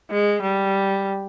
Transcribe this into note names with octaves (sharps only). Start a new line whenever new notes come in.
G#3
G3